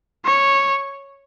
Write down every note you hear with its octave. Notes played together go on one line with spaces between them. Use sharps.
C#5